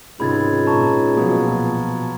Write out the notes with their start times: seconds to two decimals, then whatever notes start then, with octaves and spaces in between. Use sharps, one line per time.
0.20 C#2 G#2 C3 D#3 B5 G#6 A6
0.67 A#2 A5 A#5 C#6
1.17 B2 F3 F#3